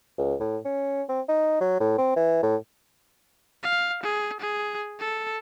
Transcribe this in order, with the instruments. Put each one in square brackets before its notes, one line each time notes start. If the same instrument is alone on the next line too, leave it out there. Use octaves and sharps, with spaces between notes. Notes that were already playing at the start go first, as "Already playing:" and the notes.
[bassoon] C#2
A2
C#4
C4
D#4
F#3
A2
C4
E3
A2
[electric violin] F5
G#4
G#4
A4